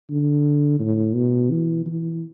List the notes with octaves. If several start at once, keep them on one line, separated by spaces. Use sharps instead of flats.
D3
A2
B2
E3
E3